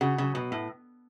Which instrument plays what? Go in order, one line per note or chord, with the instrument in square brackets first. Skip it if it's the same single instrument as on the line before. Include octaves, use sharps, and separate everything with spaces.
[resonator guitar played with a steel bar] C#3 [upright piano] F#4
[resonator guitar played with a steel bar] C#3 [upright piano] F#3
[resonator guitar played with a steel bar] B2 [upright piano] B3
[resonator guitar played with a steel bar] A2 [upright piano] B3